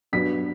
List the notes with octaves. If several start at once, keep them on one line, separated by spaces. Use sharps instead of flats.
G2 F#3 B3 B6